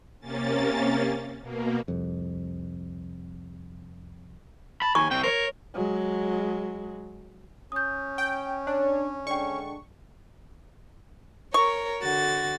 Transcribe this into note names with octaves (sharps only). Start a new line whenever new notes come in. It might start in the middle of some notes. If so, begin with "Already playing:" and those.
C3 A#3 C#4 A6
B2 A#3
C2 F2
A5 B5
D#2 G#5 C#6
C2 C3 G5
A#4 C5 C#5
F#3 G#3
C#4 D#6 G6
G5
D4 C#5
D3 G#3 D4 D5 G5 C#6
A#4 C#5 C#6
D3 F#4 A6